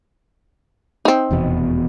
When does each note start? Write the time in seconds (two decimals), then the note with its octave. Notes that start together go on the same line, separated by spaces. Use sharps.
1.05 C4 D#4
1.31 F1 E2 B2